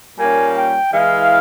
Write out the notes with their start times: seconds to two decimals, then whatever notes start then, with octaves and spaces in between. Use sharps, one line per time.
0.17 A#2 G3 A#3 C#4 G#5
0.56 G5
0.92 E3 G#3 E4 F5